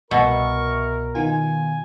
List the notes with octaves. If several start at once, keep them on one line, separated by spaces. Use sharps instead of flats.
C2 B2 A#4 E5 C#6
D#3 B3 F4 G#5